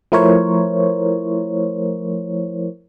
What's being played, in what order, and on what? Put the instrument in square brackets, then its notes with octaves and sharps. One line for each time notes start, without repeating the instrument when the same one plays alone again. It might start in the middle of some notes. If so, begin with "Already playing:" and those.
[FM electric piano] F3 A3 E4 A#4 C5 C#5